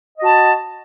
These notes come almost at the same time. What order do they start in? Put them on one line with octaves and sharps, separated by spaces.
D#5 F#4 A5